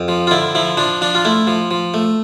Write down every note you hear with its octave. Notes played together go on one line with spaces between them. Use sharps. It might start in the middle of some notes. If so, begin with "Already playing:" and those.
Already playing: F2
F3
F4
D3 E4
F3 E4
F3 D4
F3 D4
F4
A3 E4
F3
F3
A3